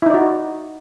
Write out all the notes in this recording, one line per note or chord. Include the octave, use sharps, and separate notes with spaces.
D#4 E4 F#4 D5